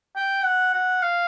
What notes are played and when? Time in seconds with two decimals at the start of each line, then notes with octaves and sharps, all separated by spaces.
0.15 G5
0.44 F#5
0.73 F#5
1.02 F5